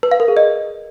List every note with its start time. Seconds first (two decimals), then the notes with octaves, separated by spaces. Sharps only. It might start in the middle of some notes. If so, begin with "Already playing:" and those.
0.03 B4
0.11 F5
0.20 A#4
0.28 G#4
0.37 D#5